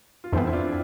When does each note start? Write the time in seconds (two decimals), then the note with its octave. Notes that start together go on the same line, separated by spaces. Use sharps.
0.24 F4
0.33 F2 E3 B3 C4 E4
0.47 E4
0.53 D4 F4